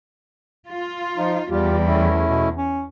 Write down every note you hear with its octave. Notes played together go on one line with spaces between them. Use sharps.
F4
F3 D#4
E2 G3 F4 G4
A3 C#4 E4
B2
C#4